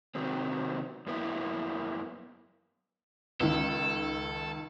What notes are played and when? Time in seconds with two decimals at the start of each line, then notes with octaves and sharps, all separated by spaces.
0.15 C3 D#3 F#3 B3 C4
1.07 F#2 A#3 B3 E4
3.40 C#2 D#3 A4